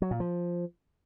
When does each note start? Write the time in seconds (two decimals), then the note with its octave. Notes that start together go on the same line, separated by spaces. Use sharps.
0.02 F#3
0.11 A#2
0.20 F3